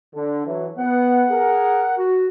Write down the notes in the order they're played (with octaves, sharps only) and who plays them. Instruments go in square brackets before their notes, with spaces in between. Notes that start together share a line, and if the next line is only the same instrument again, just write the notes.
[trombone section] D3
E3 F#3
[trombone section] B3 [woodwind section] F#5
[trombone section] G#4 A#4
[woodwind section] F#4